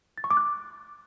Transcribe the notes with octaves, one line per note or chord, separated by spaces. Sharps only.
A6
C#6
D6
F#6